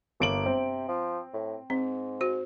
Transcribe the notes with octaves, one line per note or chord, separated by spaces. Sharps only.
G1 A#3 D7 F#7
C3 C4
F3
A2
G#2 C4
F#4 C5